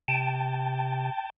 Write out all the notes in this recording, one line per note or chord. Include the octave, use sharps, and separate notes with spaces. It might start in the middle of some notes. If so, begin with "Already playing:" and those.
C3 G5 A5